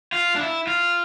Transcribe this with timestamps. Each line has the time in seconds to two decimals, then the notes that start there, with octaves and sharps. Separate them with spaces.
0.12 F4
0.35 D4
0.40 E4
0.67 F4